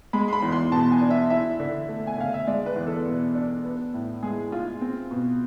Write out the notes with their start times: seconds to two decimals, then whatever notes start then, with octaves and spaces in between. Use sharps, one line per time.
0.13 G#3 B5
0.28 C6
0.33 B5
0.43 E2
0.52 C6
0.72 B2 A5
0.92 G#5
1.01 D4
1.10 E5
1.30 E4 E5
1.60 D3
1.89 A3
2.07 G#5
2.18 D3 F5
2.34 E5
2.47 G#3 D5
2.66 B4
2.76 E2
2.87 A4
3.06 B2
3.35 D4
3.64 B3
3.94 A2
4.23 G#3 G#4
4.52 F4
4.81 C4
5.11 B2